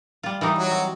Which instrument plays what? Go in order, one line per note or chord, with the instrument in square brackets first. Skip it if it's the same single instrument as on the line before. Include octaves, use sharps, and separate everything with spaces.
[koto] G3 F4
E3 G3 D#4
[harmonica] F#3 F#4
[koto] C4